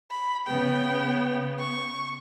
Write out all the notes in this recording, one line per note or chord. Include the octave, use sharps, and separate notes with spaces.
B5
C#3 B3 G5
C#6